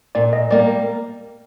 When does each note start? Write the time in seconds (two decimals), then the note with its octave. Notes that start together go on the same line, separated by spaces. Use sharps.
0.15 A#2 D5
0.33 D#5
0.50 G3 A#3 D5